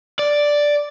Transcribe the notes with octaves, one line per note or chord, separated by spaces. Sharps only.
D5